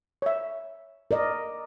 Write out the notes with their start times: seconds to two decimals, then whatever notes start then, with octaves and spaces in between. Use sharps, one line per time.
0.22 C#5 E5
1.11 A#4 D5 D#5